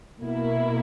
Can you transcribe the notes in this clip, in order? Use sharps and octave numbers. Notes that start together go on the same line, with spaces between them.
B2 A#3 E4